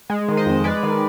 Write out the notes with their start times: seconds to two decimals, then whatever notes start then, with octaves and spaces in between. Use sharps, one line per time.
0.10 G#3
0.28 D#3
0.37 C5 D#5
0.46 F2
0.64 G#3 B4 D5
0.83 D#3